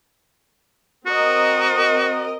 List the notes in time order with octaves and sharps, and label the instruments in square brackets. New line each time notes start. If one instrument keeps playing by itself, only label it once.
[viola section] C4 A#4 D#5 [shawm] F#4